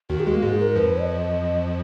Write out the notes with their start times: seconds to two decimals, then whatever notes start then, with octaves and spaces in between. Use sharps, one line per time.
0.10 D#2 D#3 F#4
0.20 G#4
0.26 G#3 F#4
0.34 A#3
0.43 G#2 G#3 G#4
0.60 A#4
0.76 F2 F3 B4
1.01 D#5